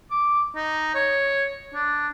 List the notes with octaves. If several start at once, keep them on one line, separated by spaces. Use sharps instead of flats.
D6
D#4
C#5
D4